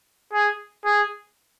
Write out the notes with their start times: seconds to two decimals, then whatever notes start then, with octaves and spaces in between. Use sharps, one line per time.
0.33 G#4
0.85 G#4